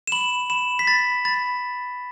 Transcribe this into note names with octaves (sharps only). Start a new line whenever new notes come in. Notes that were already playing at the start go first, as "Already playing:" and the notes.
E7
B5 F#7
B5 E7
B6
B5 A6
B5 A6